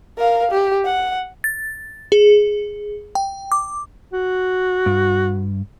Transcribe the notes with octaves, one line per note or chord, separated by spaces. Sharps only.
A#4 F5
G4
F#5
A6
G#4
G5
D6
F#4
G2